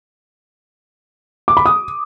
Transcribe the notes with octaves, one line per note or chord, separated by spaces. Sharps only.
D6
B5
D#6